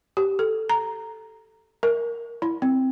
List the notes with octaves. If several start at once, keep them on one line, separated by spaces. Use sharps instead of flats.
G4
A4
A#5
A#4
E4
C4